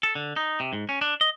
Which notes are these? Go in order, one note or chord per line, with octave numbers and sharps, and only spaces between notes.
A4
D3
D#4
C3
G#2
C#4
D4
D#5